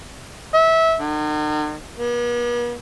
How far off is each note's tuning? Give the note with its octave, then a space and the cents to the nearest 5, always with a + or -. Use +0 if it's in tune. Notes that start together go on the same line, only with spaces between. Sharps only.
E5 -20
D#3 -45
B3 -45